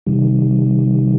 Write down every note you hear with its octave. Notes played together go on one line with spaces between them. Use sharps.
C3 D#3 G3